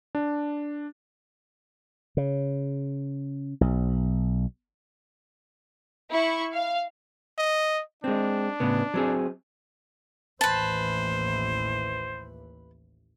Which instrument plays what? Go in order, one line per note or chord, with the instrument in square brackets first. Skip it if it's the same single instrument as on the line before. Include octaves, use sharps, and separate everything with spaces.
[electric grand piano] D4
[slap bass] C#3
B1
[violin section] E4 C#6
F5
[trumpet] D#5
[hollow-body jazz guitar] G#3 C4 [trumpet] D4
[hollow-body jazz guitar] A2 C#3 B3
F#3 C4 G#4
[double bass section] A1 D#2 E3 [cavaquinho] B4 A5 [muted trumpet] C5